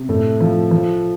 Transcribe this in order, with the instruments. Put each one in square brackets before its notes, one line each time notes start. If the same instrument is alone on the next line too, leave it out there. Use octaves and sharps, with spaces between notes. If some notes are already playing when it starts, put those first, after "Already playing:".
Already playing: [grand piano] C3
A2 A4
F3
F3